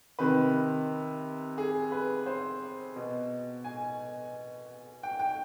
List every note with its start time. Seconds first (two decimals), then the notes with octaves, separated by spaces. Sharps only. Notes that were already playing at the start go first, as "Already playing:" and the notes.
0.19 C3 D#3 B4
1.58 G#4
1.92 B4
2.26 C5
2.96 B2
3.64 G#5
5.03 G5
5.19 G5